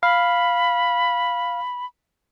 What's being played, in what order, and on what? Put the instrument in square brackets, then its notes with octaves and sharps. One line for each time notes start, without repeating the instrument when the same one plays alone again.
[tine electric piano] F5 [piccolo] B5